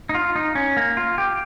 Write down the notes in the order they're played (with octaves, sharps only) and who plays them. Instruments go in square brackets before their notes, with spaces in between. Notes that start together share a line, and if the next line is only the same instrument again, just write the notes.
[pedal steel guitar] D#4
F4
D#4
C#4
A#3
F4
G4